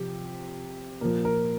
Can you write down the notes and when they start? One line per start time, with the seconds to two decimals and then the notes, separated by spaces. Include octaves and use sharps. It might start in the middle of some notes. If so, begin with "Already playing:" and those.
Already playing: C3 F3 G4
1.01 A#2 F3 A#4
1.25 A#4